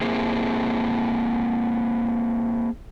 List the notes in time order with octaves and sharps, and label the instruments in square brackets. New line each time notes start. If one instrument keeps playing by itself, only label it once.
[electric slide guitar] A#3 C4 E4 G#4